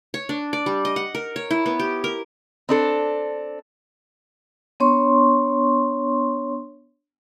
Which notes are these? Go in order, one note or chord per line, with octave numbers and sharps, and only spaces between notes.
C#5
D4
D5
G3
D#5
F#5
A#4
C#5
E4
B3
G4
A#4
C4 D4 A4
B3 D4 C#5 C6 C#6